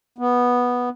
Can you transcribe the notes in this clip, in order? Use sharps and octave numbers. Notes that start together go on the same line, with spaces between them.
B3